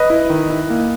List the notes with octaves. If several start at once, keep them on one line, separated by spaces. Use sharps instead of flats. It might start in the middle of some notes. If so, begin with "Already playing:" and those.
Already playing: B4 D#5
E4
D#3
E4
A#3